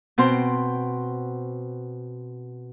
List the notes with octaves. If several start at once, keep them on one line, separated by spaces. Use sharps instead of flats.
B2 C4 C5 C6